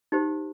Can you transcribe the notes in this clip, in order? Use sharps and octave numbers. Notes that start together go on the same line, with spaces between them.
D#4 G4 C5